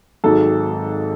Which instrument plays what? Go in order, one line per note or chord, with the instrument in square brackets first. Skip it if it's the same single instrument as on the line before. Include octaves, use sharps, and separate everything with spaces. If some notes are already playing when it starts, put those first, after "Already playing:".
[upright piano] G#1 G#2 F#3 A4